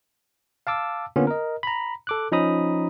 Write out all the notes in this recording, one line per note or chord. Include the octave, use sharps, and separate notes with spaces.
F5 A5 D6 E6
D3 A#3 B3 C#4 F4
A#4 D#5
A#5 B5
A4 D6 F#6
F3 C#4 D#4 A#5 B5 D#6